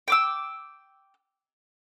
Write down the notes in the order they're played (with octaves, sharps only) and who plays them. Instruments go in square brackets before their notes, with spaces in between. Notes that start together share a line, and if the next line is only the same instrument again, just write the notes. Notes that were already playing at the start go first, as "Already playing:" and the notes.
[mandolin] G5 D6 E6